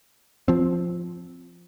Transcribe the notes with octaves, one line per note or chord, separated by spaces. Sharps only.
F3 C4